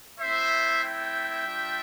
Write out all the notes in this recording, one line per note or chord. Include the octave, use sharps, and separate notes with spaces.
A3 C4 E4 C5 E5
E5 G5
G3 D4 F4